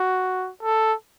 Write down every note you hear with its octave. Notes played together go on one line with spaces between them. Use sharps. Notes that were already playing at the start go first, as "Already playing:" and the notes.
Already playing: F#4
A4